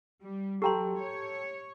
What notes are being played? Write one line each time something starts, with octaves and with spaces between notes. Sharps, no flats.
G3
F#3 G4 A4 G5 A#5 C6
C#5